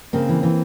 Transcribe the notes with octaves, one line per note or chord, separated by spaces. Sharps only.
C#3 A#3 C4
E3
E3